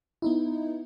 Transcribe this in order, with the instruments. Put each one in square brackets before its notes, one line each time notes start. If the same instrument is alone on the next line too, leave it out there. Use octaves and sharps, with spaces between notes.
[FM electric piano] B3 D#4 E4